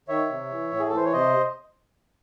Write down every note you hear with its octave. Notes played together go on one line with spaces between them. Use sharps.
D#3 C#5 E5
C3
E3
A2
G#4
A4
E3 C5
C#5
C3 C5 D#5